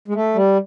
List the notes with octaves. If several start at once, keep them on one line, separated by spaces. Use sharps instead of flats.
G#3
A3
G3